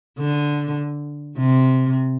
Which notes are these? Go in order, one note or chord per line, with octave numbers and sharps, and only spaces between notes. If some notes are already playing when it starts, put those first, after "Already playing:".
D3
C3